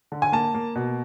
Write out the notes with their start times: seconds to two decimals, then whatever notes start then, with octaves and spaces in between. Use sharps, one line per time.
0.12 D3
0.22 G#5
0.32 A#3 A5
0.54 A#3
0.75 B2